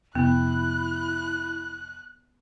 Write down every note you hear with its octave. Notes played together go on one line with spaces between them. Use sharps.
F1 B3 E4 F#6